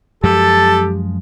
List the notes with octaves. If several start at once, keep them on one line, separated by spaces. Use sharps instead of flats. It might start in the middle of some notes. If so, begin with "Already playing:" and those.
F#2 F3 G#3 G4 A4 A5